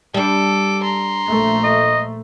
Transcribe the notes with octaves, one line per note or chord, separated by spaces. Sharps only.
G3 D4 A4 D6
A#5 C6
A#1 A3
D#5